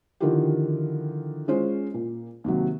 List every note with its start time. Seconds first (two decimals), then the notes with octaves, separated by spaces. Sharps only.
0.20 D3 D#3 F3 E4 F4 G4
1.48 G#3 C#4 F4 C5
1.94 A#2
2.44 D#2 C3 F#3